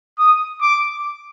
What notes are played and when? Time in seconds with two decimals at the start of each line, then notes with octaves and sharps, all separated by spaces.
0.18 D#6
0.61 D6